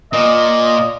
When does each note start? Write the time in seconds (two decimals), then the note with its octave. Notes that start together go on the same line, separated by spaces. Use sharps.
0.13 A#2 D#5